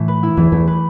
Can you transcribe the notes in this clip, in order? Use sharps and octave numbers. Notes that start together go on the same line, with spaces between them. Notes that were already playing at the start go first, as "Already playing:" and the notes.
Already playing: A2 E3 A3
B4
E4
E2 E3
E2 A3
B4